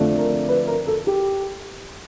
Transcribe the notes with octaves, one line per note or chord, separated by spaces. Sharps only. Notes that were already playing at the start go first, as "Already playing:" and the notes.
Already playing: F2 D3 F3 A3 D4
A#4
B4
A#4
A4
G4